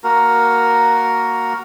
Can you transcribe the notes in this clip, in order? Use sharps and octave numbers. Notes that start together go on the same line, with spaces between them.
A#3 F#4 A#4